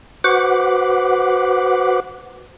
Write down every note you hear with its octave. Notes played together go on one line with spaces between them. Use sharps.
F#4 B4 C5 F#5 D6